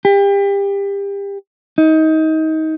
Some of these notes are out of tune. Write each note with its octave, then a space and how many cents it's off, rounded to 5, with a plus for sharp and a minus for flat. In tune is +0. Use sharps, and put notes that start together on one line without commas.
G4 +30
D#4 +25